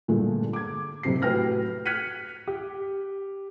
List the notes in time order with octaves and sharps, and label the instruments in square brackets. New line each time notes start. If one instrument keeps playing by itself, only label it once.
[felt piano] G2 A#2 D3 G#3 A3
D6 G#6
F#1 C3 C4 G4 C7
A2 F#4 B4 G5 F6 A#6
F6 F#6 G#6 B6 C#7 D#7
[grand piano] G4